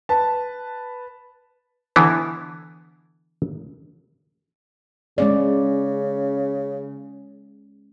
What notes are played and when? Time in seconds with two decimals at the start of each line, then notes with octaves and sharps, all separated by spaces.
0.09 B4 A5
1.96 D3 E3 B3
5.18 C#3 G#3 C#4 D5